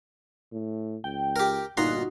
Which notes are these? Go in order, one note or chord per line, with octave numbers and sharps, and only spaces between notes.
A2
C#2 G5
G4 A#4
G1 A#2 D#4 F#4 A#5 C6